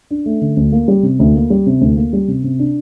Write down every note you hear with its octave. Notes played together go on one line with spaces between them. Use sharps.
D4
A3
D3
D2
A#3
G3
C3
D2
A#3
G3
C3
D2
A#3
G3
C3
C3
D4